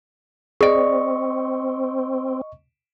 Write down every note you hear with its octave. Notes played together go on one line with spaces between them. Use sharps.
C4 G#4 D5 D#5 C#6